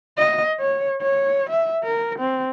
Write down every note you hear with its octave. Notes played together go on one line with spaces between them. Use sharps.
D#5
C#5
C#5
E5
A#4
C4